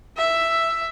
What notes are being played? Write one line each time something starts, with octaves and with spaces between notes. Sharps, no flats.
E5